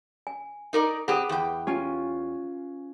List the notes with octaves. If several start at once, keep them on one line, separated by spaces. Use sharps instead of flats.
G#5
D#4 A#4 D5
C4 G4 G#4 B4 F#5 D#6
E2 G5
C#4 F4 G4 G#5